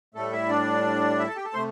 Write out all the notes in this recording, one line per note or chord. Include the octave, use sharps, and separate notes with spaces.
A2 G3 A3 A4
E4 E5
D4 D5
E4 E5
A4 A5
G4 G5
A4 A5
C3 A3 C5 C6